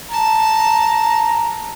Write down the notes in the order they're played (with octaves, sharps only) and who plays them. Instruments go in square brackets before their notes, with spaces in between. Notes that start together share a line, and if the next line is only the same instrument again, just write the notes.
[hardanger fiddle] A5 [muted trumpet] A#5